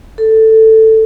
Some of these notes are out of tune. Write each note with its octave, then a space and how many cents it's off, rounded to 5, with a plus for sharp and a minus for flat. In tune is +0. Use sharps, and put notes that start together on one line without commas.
A4 +10